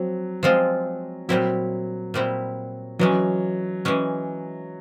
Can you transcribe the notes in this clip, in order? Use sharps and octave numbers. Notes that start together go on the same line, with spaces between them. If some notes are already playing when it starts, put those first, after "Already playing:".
Already playing: F3 F#3 C4
F3 G#3 C4 F4
A#2 F#3 G3 C4 E4
A#2 G3 C4 E4
E3 F#3 G#3 C#4
E3 G#3 C#4